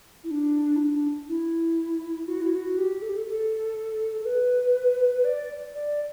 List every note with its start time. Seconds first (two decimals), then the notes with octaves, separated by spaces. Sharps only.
0.24 E4
0.31 D4
0.76 E4
0.80 D4
1.29 E4
2.28 F#4
2.41 E4
2.55 F#4
2.78 G4
3.02 A4
3.10 G4
3.17 A4
3.28 A4
4.21 A4
4.26 B4
5.24 D5
5.74 D5